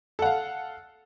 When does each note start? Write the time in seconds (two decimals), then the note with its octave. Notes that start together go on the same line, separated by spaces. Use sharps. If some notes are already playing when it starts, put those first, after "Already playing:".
0.19 A4
0.22 F#5
0.26 F5